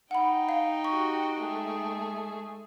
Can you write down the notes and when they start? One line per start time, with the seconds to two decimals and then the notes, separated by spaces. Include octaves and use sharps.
0.11 D#4 F#5 G5 B5
0.49 F5
0.85 F#4 G4 C#6
1.39 G#3 A3 G#4